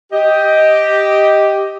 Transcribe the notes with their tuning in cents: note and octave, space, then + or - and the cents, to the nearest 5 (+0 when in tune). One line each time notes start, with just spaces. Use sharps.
G4 +0 D#5 +10